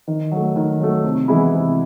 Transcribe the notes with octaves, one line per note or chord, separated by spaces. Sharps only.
D#3
F#3 A3
D#3
F#3 A3
C3
E3 G#3 B3 E4
C3